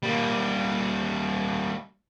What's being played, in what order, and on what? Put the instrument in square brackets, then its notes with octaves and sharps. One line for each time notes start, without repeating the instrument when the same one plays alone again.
[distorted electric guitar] G3 A#3